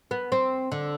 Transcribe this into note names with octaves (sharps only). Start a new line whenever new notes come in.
B3
C4
D3